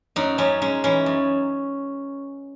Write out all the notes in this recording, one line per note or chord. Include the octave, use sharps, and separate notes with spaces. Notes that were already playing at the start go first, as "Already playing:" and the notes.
F#2 D#4
F#2 C#4
G#3 C#4
E3 C#4
F#2